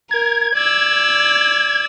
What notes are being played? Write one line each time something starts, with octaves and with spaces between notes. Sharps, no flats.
A#4 G#6
D5 E6